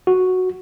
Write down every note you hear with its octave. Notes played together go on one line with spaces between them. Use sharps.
F#4